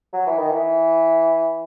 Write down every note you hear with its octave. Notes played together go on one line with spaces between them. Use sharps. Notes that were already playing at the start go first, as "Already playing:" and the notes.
F#3
E3
D#3
E3